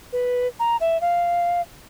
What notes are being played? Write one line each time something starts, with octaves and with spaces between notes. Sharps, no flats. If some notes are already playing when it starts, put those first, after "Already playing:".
B4
A#5
E5
F5